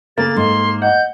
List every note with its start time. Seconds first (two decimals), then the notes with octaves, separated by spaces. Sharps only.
0.18 C#3 A#3 A4 A6
0.36 G#2 C6
0.82 D#5 F#5 G6